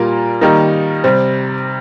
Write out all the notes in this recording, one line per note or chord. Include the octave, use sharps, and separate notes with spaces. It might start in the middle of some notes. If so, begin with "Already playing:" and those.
Already playing: A#2 G3 A#3 F4 A#4
D#3 G3 A#3 D#4
C3 G3 C4